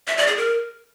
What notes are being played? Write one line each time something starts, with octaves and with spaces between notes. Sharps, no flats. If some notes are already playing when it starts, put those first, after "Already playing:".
E5
D5
G#4
A#4